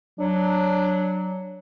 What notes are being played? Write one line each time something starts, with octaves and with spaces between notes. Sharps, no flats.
F#3 D4